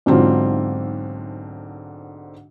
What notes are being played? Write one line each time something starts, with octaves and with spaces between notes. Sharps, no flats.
B1 G#2 D3 C4 F4